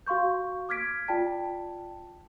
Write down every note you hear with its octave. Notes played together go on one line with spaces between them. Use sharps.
F#4 F5 C6 C#6 G6
D6 F6 G#6 B6 D7
F4 D5 G5 A5 B6